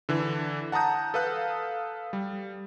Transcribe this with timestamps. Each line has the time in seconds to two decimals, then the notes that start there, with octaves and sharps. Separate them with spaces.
0.09 D3 E3
0.72 F#5 A5 A#5 D#6 G6
1.14 A4 B4 F5 D#6 F#6
2.13 G3